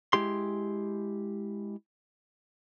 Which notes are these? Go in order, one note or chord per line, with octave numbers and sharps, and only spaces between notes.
G#3 E4 G4 C6